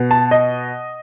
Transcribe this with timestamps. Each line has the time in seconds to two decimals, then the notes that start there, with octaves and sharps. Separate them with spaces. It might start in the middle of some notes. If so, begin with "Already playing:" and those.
Already playing: B2
0.11 A5
0.31 D#5